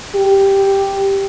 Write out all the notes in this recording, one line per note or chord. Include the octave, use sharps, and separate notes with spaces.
G4